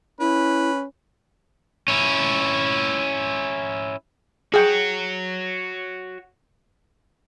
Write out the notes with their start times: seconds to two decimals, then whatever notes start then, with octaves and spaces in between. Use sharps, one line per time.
0.20 C#4 E4 B4
1.88 C#4 E4
4.54 F#4 G#4 C#5 G5